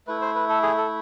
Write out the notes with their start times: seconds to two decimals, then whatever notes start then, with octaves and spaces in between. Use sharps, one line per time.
0.07 A3 E4 B4
0.21 C5
0.35 B4
0.49 A4
0.63 G#4
0.77 A4